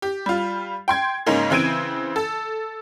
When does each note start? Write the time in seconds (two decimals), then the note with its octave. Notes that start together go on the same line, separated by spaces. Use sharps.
0.02 G4
0.26 G3 F4
0.88 G5 C6 G#6
1.26 G#2 C#3 A#3 C#4 D#4
1.50 C#3 E3 C4 G#6 D7 D#7
2.16 A4